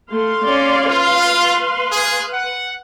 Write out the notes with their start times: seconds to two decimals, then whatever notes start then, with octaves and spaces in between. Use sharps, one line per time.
0.11 A3 F5 C6
0.44 C#4 D5
0.91 F4 B4
1.92 G#4
2.33 F#5